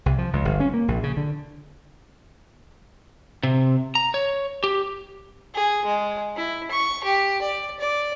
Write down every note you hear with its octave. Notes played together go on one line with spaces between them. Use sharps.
C2
F3
C#2
G1
C#4
A#3
A#1
C#3
D3
C3
A#5
C#5
G4
G#4
G#3
E4
C#6
G4
D5
D5